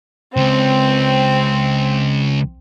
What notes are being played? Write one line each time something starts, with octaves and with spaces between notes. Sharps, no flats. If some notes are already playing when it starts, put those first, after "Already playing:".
C#2 C4